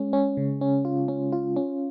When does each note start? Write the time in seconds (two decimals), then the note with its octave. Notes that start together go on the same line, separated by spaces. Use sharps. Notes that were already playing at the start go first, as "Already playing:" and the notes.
Already playing: G#3 C#4
0.13 C#4
0.37 C#3
0.61 C#4
0.85 F4
1.08 C#4
1.32 F4
1.56 C#4